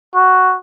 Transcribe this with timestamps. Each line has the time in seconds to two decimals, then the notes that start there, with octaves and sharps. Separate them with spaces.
0.15 F#4